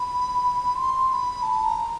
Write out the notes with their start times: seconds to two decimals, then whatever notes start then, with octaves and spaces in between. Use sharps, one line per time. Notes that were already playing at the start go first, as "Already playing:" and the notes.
Already playing: B5
0.76 C6
1.08 C6
1.13 B5
1.43 A5
1.64 A#5